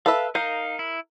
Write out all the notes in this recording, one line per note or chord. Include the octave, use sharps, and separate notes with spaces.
A4 B4 E5 F5
D#4 A#4 F5 G6
E4